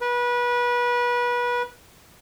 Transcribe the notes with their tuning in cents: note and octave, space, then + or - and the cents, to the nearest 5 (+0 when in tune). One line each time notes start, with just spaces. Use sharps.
B4 -25